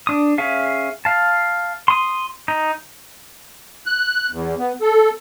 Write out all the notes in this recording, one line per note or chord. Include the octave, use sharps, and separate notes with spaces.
D4 D#6
C#4 G#4 E5 F5
F5 A5
C6 D#6
D#4
F#6
E2
B3
A4